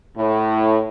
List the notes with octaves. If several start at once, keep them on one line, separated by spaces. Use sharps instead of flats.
A2